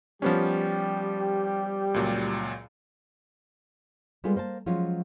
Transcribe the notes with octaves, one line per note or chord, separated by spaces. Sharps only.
F3 G3 B3 C#4 G4
C#2 A#2 F#3
G3 G#3 B3 F4 G#4 A4
A#3 C5 G5 A5
F3 F#3 G#3 C#4 F4 F#4